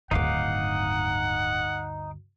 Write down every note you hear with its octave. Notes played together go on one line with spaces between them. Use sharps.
D1 D2 G2 D#3 D#4 F5 F#5 D6